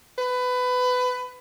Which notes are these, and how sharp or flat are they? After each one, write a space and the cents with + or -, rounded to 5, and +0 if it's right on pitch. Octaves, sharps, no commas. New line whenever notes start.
B4 +20